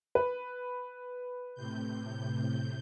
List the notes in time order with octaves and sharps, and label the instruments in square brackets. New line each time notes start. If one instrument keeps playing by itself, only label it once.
[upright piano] B4
[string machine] A2 C3 G6